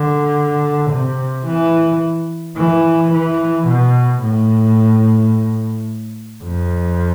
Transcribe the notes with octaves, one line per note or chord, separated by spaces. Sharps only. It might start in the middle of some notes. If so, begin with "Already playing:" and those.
Already playing: D3
C3
E3
E3
E3
B2
A2
F2